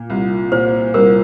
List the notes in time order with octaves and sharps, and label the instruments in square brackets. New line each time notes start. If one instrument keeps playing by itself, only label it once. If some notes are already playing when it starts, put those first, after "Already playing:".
Already playing: [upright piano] A#2
C2
[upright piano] A#2 [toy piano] C5
[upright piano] C2 [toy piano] A#4